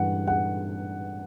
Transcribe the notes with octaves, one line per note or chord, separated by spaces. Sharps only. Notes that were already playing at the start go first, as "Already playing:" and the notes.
Already playing: G2 E3 F#5
F#5